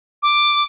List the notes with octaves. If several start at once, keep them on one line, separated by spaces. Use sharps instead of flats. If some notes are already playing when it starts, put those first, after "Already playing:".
D6